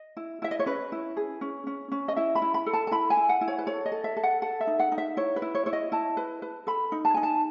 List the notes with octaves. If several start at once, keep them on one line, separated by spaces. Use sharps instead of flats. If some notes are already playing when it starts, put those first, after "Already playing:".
Already playing: D#5
E4
E4 E5
D#5
C#5
C#4 B4
E4
G#4
C#4
C#4
C#4
D#5
E4 E5
B5
E4
B5
A4
A5
A5
E4 B5
G#5
E4
F#5
E4
C#5
B4
A4 C#5
D#5
A4
E5
A4
F#5
A4 F#5
E5
D#4
F#5
D#4
E5
E4 C#5
B4
E4
C#5
E4 C#5
D#5
E4 A5
B4
B4
A4 B5
D#4
A5
D#4 G#5
A5